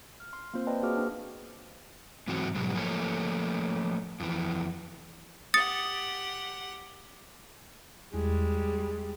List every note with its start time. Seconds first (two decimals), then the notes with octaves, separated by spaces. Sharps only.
0.20 F6
0.33 C6
0.54 A#3 C4 F4 C5
0.67 B4 C5 D5 D#5 G5 A5
0.82 A#3 F#4 G#4 D6 F6
0.97 D4
2.28 G#2 E3 F#3 C4 F#4
2.55 G#2 B2 F#3 G3
2.75 F3 A3 A#3 A#4 C#5
4.20 F2 E3
5.54 G4 F#5 D#6 A6 C#7
8.14 E2 G3 G#3